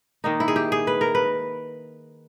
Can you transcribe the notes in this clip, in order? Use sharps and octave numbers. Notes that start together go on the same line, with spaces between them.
D#3 A#3 D#4
E4
G#4
G4
G#4
B4
A#4
B4